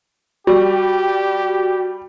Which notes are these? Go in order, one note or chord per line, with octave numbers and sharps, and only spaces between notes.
G3 F#4 G4